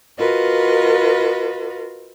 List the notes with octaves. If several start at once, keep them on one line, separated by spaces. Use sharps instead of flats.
F4 F#4 A#4 B4 D#5